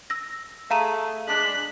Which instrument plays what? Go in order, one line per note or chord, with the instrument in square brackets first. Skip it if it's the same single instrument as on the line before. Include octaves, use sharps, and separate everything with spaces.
[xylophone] E6 A#6
[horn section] A3 G#4 [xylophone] F5 A#5 D#7
[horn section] G#3 D4 [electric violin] F#6 B6